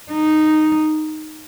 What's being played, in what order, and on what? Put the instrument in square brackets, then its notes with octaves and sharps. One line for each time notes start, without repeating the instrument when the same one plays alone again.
[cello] D#4